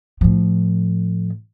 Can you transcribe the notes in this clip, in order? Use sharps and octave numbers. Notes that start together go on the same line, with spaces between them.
A2 F3